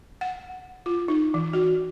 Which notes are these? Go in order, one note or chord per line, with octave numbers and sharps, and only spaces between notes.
F#5
F4
D#4
E3
F#4